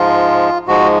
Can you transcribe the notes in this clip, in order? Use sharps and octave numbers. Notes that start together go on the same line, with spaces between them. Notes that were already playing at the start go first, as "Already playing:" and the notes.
Already playing: G#2 F3 G#3 F4
G#2 F3 G#3 F#4